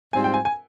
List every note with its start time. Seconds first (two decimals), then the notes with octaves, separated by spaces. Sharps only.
0.13 G#2 G3 C4 F4 C5 G#5
0.24 G5
0.34 G#5
0.45 G#5